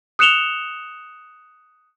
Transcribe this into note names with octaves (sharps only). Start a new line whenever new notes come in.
D#6 F#6 C#7 E7 F7 G7